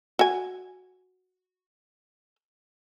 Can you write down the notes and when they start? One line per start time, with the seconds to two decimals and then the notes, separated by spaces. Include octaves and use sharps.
0.19 F#4 G#5